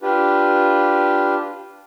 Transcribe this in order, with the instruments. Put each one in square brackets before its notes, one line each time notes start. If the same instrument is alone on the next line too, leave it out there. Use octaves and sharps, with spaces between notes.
[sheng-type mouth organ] D4 F4 G4 B4